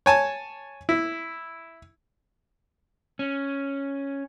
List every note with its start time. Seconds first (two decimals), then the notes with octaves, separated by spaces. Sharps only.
0.06 C#5 G#5 A5
0.89 E4
3.19 C#4